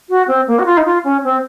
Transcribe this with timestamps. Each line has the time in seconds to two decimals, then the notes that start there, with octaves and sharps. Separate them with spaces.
0.09 F#4
0.28 C4
0.48 A#3
0.59 F#4
0.65 F4
0.77 D#4
0.85 F4
1.04 C#4
1.24 C4